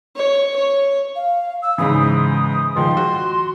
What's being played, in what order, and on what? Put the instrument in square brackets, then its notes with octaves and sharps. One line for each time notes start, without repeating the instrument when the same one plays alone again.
[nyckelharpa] C#5
C#5
[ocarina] F5
E6
[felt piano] G#2 C#3 E3 [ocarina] D#6
[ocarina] D#6
[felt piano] D#3 F3 G#3 [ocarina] C6
[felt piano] F#4